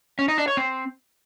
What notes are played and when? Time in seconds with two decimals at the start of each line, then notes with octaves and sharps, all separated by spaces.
0.19 C#4
0.28 D#4
0.38 D4
0.48 C#5
0.57 C4